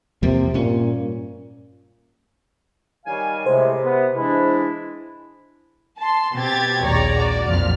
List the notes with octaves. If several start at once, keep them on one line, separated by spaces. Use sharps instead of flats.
E2 C3 F3 A#3
G2 A#2 C#4
D#3 G3 C#5 F5 G#5
A2 C3 G#3 C5
B3
E3 G#3 D4 E4
A5 C6
B2 C4 G4 G#6 A6
A#1 D#2 G#3 C#5 D5 A#5
F#4 D5
B1 F2 A#2 F6